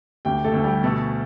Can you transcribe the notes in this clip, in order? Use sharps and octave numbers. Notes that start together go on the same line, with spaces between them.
D2 G4 G5
A3 A4
D2
G3 G4
B2 A3 A4